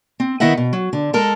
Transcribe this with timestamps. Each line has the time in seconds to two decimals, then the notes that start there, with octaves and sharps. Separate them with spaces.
0.20 C4
0.40 D#3 B3 E4 D#5 E5 F#5
0.57 B2
0.73 F#3
0.93 D3
1.13 G#3 A4 A#4